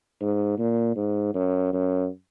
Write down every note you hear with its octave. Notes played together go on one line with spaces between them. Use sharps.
G#2
A#2
G#2
F#2
F#2